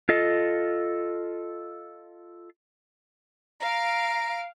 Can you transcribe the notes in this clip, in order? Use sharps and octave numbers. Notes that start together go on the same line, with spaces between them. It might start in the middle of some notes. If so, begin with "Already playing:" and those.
F4 A4 D#5
F5 A#5 D7